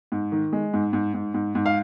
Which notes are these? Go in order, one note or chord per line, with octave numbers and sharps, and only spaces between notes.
G#2
D#3
G#3
G#2
G#2
G#2
G#2
G#2
F5